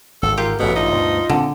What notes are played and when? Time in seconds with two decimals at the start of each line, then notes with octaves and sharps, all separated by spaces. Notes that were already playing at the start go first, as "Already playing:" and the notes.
0.23 G#1 A4
0.37 F4 G4 A#4
0.59 A1 G2 B2 A4
0.76 D#4 F4
0.93 D2 G2 B2
1.30 A#2 D3 E3 C4